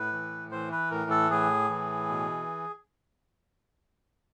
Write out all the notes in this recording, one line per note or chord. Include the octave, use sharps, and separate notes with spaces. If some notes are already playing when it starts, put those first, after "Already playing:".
Already playing: A2 B4
E3
E3 C5
B4
A2 A#4
A4
A2 G#4
E3
B2